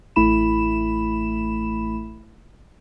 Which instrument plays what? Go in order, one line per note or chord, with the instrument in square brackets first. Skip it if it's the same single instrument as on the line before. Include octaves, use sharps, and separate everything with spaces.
[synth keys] A1 A3 E4 B5 E7